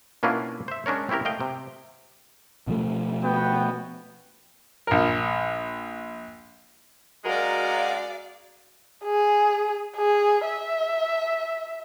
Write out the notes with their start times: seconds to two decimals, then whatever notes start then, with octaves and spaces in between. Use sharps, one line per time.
0.23 B2 A#3 C#4 D4 E4 F4
0.68 C5 E5
0.86 G#3 C#4 D4 A#4 C#5
1.09 C4 C#4 E4 G4 A#4
1.25 A3 D#5 F5 G5
1.40 C3
2.67 B2 F3 A3
3.22 B3 F#4 G5
4.87 A#1 A#4
7.25 F#2 G#3 F#4 A#4 D5 F5
9.05 G#4
9.96 G#4
10.46 E5